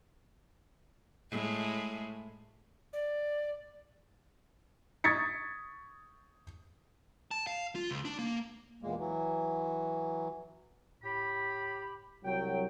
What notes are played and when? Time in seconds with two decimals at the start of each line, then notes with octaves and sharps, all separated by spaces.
1.31 A2 G#3
2.93 D5
5.04 C#6 D#6 G#6 A6 B6 C#7
7.31 A5
7.47 F5
7.75 F4
7.90 C#2
8.05 D4
8.19 A#3
8.82 E2 A#2 G#3 A#3
8.98 E3 F#3
11.03 A2 G4 B5
12.24 C2 F#3 G5